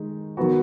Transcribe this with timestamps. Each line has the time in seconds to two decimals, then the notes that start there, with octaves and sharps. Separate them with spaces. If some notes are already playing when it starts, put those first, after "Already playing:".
Already playing: D#3 G#3 D#4
0.37 D#3 F#3 B3 F#4